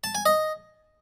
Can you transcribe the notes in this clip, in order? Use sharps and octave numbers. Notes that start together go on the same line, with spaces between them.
A5
G#5
D#5